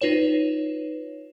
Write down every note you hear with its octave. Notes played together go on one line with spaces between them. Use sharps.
D#4 F4 B4 C#5 E7